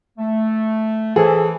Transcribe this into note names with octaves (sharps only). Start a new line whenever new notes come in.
A3
E3 G#4 A4 C5